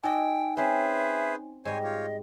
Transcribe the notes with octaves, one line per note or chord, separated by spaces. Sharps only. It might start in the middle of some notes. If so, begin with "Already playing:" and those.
D#4 F#4 D5 D#5 G5 G#5
C4 C#4 G#4 B4 C5 E5
G#2 G3 C5 C#5 D#5 G#5
F4 G4 C#5